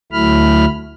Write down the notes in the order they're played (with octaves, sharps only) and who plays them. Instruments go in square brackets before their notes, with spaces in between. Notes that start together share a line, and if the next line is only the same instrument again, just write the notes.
[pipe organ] D2 F#3 A3 E4 B5 F6